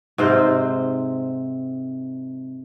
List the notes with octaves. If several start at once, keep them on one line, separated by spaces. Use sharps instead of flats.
G#2 C3 C5